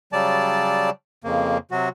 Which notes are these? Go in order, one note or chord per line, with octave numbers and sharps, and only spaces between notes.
C#3 F#3 G3 D5 A5
F2 C#3 A#3
C3 F#3 F#4